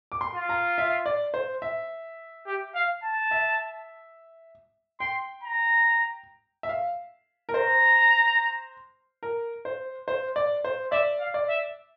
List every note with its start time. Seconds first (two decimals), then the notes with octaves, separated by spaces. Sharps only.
0.12 D6
0.21 C6
0.35 F4
0.49 A#5
0.78 E5
1.06 D5
1.34 C5
1.62 E5
2.47 G4
2.75 F5
3.04 A5
3.31 E5
5.00 G5 C6
5.43 A#5
6.63 E5
6.69 F5
7.49 A#4
7.53 C5 A#5
9.23 A#4
9.65 C5
10.08 C5
10.36 D5
10.64 C5
10.92 D5 E5
11.20 F5
11.34 D5
11.49 E5